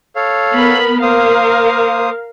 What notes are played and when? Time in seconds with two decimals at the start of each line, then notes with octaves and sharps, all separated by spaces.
0.16 A4 C#5 F5
0.53 B3 A#4 B5
1.02 A#3 A#4 C5 F5 D#6